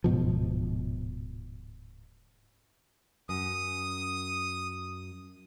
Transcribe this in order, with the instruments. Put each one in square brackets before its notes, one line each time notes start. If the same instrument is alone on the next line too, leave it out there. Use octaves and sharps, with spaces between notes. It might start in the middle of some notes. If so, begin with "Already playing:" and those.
[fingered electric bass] D1 G#2 B2 F3
[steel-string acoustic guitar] F#2 [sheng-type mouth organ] D#6